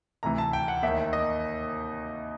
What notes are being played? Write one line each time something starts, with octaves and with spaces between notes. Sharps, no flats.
D2 C3 E3 A#5
A5
G5
F#5
D#2 D#3 E5
D#5